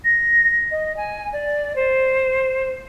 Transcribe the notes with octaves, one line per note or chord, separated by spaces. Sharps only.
A#6
D#5
G#5
D5
C5